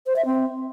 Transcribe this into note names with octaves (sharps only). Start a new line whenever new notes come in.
C5
E5
C4